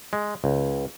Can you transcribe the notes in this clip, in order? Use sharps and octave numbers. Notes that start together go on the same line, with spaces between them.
G#3
C#2